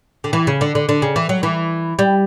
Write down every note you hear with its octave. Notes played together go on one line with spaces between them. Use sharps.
D3
E3
C#3
D3
D3
D3
C#3
E3
F#3
E3
G3